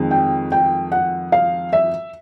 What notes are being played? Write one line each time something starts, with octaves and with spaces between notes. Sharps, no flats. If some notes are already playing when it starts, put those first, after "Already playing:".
Already playing: F2 D#3 G#3
G5
G5
F#5
F5
E5